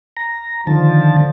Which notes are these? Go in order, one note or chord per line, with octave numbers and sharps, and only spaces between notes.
A#5
D3 D#3 F3 A5